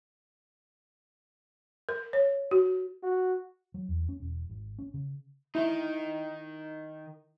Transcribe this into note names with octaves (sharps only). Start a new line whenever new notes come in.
A#4
C#5
F#4
F#4
F#3
E2
C#4
E1
G#1
C#4
C#3
D#3 D#4 E4